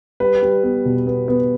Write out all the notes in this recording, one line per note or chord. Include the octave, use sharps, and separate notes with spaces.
G3 B4
G3
B3
B2
B3
B3